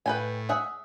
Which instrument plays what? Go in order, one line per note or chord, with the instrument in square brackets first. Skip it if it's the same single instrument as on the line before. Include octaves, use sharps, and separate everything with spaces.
[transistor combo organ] A2 [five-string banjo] B4 G5 G#5
[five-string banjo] G#4 E5 F#5